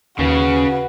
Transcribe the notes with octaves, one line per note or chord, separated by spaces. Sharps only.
D#2 C#3 F#4 B4